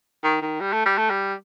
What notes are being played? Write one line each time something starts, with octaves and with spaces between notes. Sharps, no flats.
D#3
D#3
G3
A3
G3
A3
G3